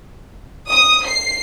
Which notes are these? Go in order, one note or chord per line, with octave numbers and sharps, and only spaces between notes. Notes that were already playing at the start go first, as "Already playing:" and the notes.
D#6
C7